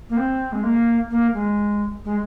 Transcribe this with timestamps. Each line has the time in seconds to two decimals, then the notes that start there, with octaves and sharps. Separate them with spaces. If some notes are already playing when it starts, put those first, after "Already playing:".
0.09 A#3
0.16 C4
0.52 G#3
0.63 A#3
1.10 A#3
1.33 G#3
2.04 G#3